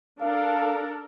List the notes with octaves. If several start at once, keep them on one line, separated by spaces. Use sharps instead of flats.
D4 A4 A#4 F5